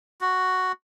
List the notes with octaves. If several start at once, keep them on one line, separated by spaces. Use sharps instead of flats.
F#4